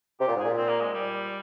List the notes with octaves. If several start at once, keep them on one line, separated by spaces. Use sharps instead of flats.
C3 G4
A#2
G#2
A#2 G#4
C4
A#3
G#3
G3